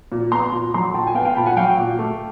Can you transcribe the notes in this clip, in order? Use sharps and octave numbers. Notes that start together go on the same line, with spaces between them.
A#2
B3 A#5 C6
A#2
F#3 A#5 C6
A#2 G5 A5
G#5
B3 F5 G5
F5 G5
A#2 A5 B5
F#5 G#5
F#3 F5 G5
A#2
A3